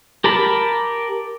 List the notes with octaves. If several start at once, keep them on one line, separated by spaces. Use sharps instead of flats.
G4 A#4 A5 B5